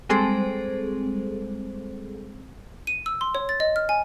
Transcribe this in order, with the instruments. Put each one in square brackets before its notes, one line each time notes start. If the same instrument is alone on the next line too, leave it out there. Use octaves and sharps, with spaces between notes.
[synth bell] G3 G#3 C4 G#4 A4 C5
[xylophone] D#7
E6
C6
C#5
A6
D#5
F6
G#5